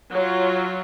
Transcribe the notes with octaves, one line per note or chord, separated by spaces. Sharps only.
F#3 F4 C#5